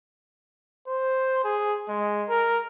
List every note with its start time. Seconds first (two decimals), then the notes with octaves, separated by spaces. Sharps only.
0.87 C5
1.44 G#4
1.88 G#3
2.29 A#4